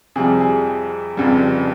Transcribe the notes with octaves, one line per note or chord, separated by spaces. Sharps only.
F2 C3 G3 G#4
G#4
F1 F2 C#3 G3